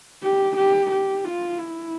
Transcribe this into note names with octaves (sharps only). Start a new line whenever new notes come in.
G4
G4
G4
F4
E4